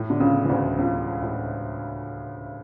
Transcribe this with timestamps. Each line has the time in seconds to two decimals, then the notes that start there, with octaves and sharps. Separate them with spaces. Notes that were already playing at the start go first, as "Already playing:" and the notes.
Already playing: A2
0.10 D3
0.20 C#2 C#3
0.45 E3
0.49 D2 D3
0.78 C#2 C#3
1.22 A2